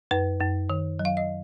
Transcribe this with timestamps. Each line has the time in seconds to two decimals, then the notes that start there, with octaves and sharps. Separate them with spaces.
0.11 F#2 B4
0.40 F#2
0.70 D#3
0.99 F#3
1.05 F5
1.17 D#5